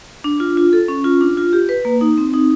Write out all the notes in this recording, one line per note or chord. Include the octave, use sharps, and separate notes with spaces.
D4
F4
F4
A4
C#4
F4
D4
F4
G4
B4
A#3
D#4
C4
D#4